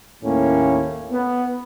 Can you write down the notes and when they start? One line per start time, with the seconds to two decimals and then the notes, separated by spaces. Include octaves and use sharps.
0.23 D#2 A2 A#3 C#4
1.12 B3